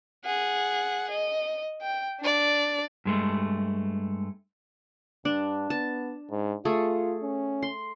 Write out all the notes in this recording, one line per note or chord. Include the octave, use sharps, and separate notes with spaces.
G#4 F#5
D#5
G5
D4 D5
G2 G#3 A3
G2 D4
B3 A5
G#2
A3 F4 G#4
C#4
C6